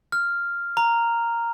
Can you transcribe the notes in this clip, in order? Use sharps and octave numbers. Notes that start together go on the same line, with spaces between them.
F6
A#5